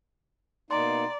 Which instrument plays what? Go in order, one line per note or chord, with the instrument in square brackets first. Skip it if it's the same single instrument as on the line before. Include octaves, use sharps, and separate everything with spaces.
[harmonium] B2 A#3 D#4 [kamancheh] D5 [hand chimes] A#5 C6